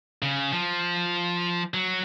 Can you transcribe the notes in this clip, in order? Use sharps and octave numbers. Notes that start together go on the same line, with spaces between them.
C#3
F3
F#3